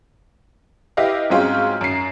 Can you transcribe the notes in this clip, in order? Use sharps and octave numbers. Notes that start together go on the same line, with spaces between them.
E4 G4 B4 D#5 F5
G#2 F#3 G#3 C4 C#4 F4
F#2 C7